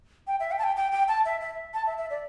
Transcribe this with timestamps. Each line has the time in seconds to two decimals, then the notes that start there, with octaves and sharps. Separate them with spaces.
0.27 G5
0.40 E5
0.51 G5
0.59 A5
0.64 G5
0.76 G5
0.92 G5
1.08 A5
1.25 E5
1.41 E5
1.74 A5
1.87 E5
1.98 E5
2.10 D5